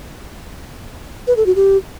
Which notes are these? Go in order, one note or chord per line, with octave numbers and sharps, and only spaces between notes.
B4
A4
F#4
G4